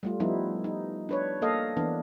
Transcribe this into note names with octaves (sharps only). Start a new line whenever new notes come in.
G3 A3 F4
F3 G3 B3 D#4 E4
D#4
D4 B4 C#5
A#3 A4 D#5 F5
E3 B3 D4